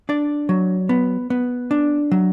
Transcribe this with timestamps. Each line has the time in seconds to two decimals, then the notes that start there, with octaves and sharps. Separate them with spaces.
0.09 D4 D5
0.49 F#3
0.89 B3
1.30 B3
1.71 D4
2.12 F#3